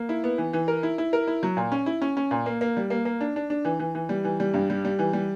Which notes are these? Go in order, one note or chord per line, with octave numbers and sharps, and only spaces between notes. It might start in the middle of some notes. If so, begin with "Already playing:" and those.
Already playing: A#3
E4
B3
E3
E3
A#4
E4
E4
A#4
E4
F#3
A#2
C#4
E4
C#4
C#4
A#2
A#3
A#3
G3
A#3
A#3
D4
D4
D4
E3
E3
E3
G3
E3
G3
G2
G3
G3
E3
G3